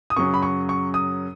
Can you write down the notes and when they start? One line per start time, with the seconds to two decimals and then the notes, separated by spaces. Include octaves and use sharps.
0.10 D#6
0.16 F#2 C#3 F#3 C#4 C#6
0.34 B5
0.43 C#6
0.69 C#6
0.94 D#6